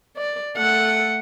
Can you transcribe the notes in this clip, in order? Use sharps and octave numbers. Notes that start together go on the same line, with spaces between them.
D5
A3 A4 F#5